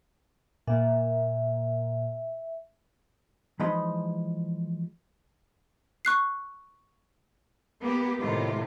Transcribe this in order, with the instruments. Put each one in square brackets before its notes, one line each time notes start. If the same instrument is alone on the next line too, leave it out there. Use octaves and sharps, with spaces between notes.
[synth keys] A#2 A#3 [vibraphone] E5
[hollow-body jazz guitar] E3 F3 G#3 D#4 D#5 B5
[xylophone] C#6 F#6 C7
[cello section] A#3 B3 G4
A2 C3 D#3 F4